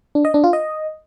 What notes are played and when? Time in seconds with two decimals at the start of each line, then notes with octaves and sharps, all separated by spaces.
0.15 D4
0.25 D#5
0.34 D4
0.44 F4
0.53 D#5